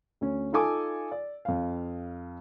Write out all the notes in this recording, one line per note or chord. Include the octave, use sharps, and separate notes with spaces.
D2 C#4
D#4 F4 A4 G#5 D6 D#6
D5
F2 F5